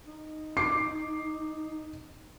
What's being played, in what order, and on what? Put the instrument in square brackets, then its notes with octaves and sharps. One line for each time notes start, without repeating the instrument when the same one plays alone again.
[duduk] D#4
[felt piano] D6 C7